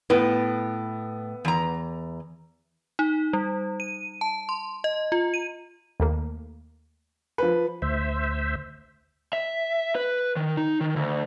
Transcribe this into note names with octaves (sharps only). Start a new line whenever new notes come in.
A2 B3
E2 A#5
D#4
G3
D#7
A5
C6
D#5
F4
D#7
D#2 A3 A#3
F3 B4
D2 C5 E5
E5
B4
D#3
D#4
D#3
D2